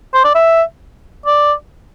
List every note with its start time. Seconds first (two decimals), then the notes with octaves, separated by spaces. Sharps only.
0.14 C5
0.24 D5
0.35 E5
1.26 D5